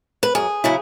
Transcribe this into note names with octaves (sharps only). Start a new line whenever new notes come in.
B4
F#2 G#4
C#3 F#3 E4